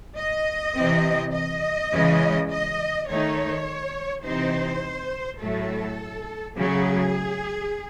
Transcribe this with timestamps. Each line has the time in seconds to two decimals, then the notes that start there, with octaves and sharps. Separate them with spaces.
0.17 D#5
0.75 C3 E3 C4
1.34 D#5
1.92 C#3 E3 G#3
2.50 D#5
3.08 D#3 A3 D#4 C#5
4.25 C3 E3 C4 D#4 C5
5.41 A2 F#3 A3 A4
6.58 C#3 F#3 A3 G#4